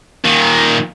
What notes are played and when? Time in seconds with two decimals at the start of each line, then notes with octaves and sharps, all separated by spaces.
0.25 A#2 D#3